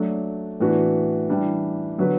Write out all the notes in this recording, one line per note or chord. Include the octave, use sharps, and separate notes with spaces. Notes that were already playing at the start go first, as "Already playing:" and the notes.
Already playing: F#3 A3 D4
A2 E3 B3 D4 F#4
E3 G3 D4
D3 F#3 B3 F#4 B4